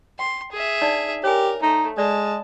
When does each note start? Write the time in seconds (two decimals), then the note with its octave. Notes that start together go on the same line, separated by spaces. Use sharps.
0.19 G5 C6
0.52 G#4 E5
0.82 D4 D#4 D5
1.24 G4 A#4 C#5 G#5
1.62 A3 D#4
1.98 G#3 D5 A5